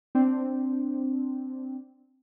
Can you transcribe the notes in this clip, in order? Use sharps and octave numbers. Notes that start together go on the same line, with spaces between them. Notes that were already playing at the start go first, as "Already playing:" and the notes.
C4 D4